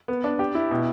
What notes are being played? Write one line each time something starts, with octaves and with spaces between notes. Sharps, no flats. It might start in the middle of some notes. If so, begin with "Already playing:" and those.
B3
D4
G4
E4
B2